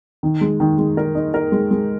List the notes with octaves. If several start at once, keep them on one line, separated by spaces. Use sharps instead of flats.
D#3
G#3
D#3
G#3
A#4
D#4
A#4
G#3
G#3